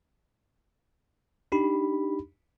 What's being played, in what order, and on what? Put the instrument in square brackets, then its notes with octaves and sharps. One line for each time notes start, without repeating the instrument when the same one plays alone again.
[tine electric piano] D4 D#4 G4 B5